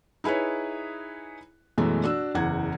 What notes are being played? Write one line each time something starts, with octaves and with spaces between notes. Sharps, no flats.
D#4 E4 G#4 B4 C#5
F#2 B2 E3 G#3 A3
D4 F#4 E6
F#1 E2 F#5 G#6